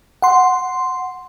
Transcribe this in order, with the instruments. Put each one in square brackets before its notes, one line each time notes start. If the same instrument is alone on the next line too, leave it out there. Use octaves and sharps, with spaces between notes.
[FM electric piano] F#5 C6